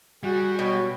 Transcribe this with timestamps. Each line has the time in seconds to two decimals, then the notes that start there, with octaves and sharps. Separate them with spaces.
0.23 G3 F#4 G#4
0.59 B2 C#5